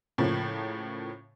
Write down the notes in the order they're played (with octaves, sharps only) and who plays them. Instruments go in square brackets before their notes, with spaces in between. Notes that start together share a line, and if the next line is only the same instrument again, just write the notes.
[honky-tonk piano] A2 C#3 F3 A#3